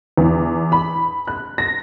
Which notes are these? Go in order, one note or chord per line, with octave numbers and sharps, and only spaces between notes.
E2
B5
F#6
A#6